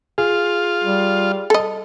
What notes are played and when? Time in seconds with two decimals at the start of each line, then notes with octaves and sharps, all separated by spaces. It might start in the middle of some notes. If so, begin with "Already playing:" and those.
0.18 F4 G#4
0.84 G3
1.50 A4 D#5